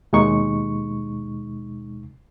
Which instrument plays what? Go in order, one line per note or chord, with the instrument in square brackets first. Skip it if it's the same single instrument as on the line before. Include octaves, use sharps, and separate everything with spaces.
[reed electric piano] D#2 B2 G#3 D#4 C#6